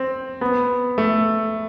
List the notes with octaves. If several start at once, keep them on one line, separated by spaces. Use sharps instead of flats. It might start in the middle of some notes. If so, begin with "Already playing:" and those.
Already playing: C4
B3
A3